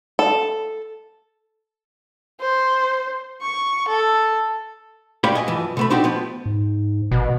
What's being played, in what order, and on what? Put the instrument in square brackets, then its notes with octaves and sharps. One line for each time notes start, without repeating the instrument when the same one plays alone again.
[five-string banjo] A4
[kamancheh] C5
C#6
A4
[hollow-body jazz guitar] A#2 G4 C#5 D5 F5 B5
D#5 G#5
B1 G2 E3 F3
B2 A3 B5
C4 D4 D#4 F#4 G4
F3 B3
[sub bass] G#2
[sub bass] G#1 [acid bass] B2